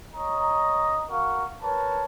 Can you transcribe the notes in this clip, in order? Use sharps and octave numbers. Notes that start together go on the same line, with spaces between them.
C#5 D#5 A#5
F#4 A#4 F5 C#6
A#4 B4 C#5 A5